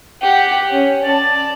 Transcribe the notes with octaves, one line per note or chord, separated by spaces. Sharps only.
G4 F#5
C#4
D5 A5